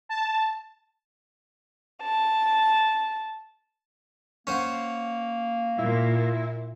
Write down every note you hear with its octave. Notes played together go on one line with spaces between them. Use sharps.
A5
A5
A#3 C#4 C5 F#5
A#2 E4